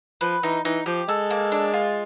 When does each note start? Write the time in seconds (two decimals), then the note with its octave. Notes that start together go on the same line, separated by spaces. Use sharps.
0.21 F3 B4
0.43 E3 D#4
0.65 E3 D#4
0.86 F3 G4
1.08 G#3 A4
1.31 A#3
1.52 D4
1.74 F4